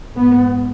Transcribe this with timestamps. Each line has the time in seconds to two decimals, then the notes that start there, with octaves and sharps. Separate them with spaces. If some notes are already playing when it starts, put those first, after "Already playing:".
0.16 G#2 B3